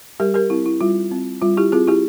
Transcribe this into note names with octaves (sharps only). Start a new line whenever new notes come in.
G3 G4 A#4
G4 A#4
C4 E4
E4
G3 F4
C4
G3 F4
E4 G4
C4 F4 G#4
E4 G4